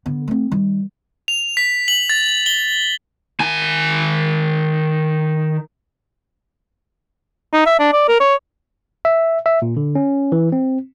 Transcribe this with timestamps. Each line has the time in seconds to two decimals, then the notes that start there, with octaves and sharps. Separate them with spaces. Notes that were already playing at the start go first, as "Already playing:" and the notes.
0.06 D3 B3
0.28 A3 C4
0.52 D#3 G3
1.28 F7
1.57 B6
1.88 F#7
2.10 A6
2.46 G7
3.40 D#3 G#5
7.53 D#4
7.66 E5
7.79 D4
7.93 D5
8.08 A#4
8.20 C#5
9.05 E5
9.46 E5
9.62 A#2
9.77 D3
9.95 C#4
10.32 E3
10.52 C4